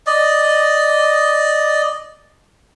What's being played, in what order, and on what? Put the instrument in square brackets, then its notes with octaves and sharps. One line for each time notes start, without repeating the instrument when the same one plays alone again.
[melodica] D5 D#5